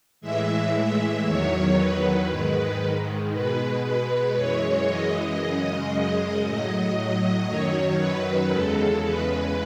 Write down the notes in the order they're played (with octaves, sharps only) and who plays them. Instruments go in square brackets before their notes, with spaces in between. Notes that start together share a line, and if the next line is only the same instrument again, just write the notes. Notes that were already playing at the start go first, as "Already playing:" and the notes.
[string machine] A2 E3 G#3 E5
E5
E2 D#3 F#3 C#5
B4
G#2 D#3 G#3 B4
B2 G#3 B4
B4
F#2 E3 G#3 C#5
D#5
F#2 C#3 G#3
A2 F#3 D#5
F#2 D#3 F#3 C#5
B4
E2 C#3 G#3 A4
B4